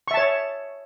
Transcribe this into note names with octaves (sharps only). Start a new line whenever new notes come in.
C#5 E5 A5 C#6